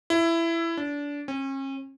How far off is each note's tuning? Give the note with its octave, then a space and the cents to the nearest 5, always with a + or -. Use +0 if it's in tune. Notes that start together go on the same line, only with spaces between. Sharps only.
E4 +15
D4 -25
C#4 -40